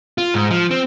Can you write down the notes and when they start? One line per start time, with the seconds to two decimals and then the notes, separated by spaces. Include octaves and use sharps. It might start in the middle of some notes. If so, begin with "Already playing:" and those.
0.18 F4
0.34 G#2
0.51 F3
0.71 C4